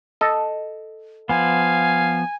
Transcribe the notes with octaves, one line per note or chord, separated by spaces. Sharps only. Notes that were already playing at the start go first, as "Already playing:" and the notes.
A4 D#5
F3 B3 F5 G#5